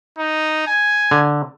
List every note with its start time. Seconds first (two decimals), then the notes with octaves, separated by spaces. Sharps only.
0.19 D#4
0.67 G#5
1.11 D3